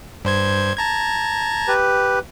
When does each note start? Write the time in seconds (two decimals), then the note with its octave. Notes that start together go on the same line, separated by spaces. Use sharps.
0.25 G2 C5 G#6
0.77 A5 A#5 G#6
1.68 G4 B4